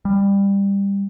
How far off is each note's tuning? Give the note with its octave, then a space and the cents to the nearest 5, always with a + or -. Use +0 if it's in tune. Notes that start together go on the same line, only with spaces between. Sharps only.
G3 +20